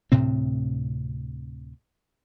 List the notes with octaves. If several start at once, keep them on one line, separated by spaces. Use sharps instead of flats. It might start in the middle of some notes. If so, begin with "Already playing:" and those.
D2 A2 C3 C4